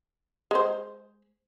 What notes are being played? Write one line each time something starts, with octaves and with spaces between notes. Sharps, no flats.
G#3 C5